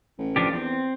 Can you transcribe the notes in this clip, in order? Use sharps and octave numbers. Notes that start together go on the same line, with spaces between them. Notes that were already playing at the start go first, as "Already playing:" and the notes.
A1
F3 D4 G4
E2 C4